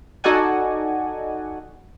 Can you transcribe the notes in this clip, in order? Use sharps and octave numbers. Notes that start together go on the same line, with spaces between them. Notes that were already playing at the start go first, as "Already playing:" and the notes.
D#4 F#4 A4 D5 F#5 G#5